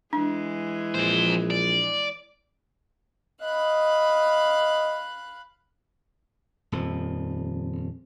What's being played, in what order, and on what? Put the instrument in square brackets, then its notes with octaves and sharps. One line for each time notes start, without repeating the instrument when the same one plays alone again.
[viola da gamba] E3 G#3 [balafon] D4
[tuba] A#1 [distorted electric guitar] F2 C5
[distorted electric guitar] D5
[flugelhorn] D#5 [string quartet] F5 B5 F#6
[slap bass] D#1 F2 F3